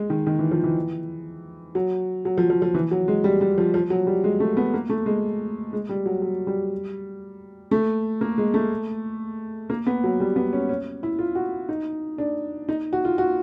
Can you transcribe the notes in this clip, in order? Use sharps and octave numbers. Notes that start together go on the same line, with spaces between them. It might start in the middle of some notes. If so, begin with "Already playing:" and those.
Already playing: G#3
D#3
D#3
E3
F3
E3
F#3
F#3
F3
F3
F3
E3
F#3
G#3
G3
G3
F3
F3
F#3
G3
G#3
A3
B3
A#3
A3
G#3
G#3
G3
F#3
F#3
G3
A3
A#3
G#3
A3
A#3
B3
F#3
G3
B3
C#4
C#4
E4
F4
F#4
D#4
D4
D#4
F#4
F4
F#4